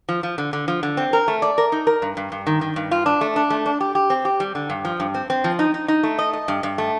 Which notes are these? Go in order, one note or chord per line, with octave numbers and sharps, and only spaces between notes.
F3
F3
D3
D3
F3
D3
C4
A#4
A3
D5
A#4
D#4
A#4
G2
G2
G2
D#3
D#3
G2
F4
D4
A3
D4
A3
D4
G4
G4
C4
G4
G3
D3
G2
F3
G2
C4
C4
F3
D#4
D#4
D#4
A3
D#5
D#5
G2
G2
A3